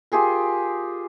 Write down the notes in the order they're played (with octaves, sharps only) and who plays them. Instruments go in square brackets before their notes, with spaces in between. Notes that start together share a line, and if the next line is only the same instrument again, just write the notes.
[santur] F4 G4 G#4 A#4